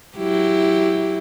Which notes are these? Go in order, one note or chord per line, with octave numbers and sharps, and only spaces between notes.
F#3 E4 G4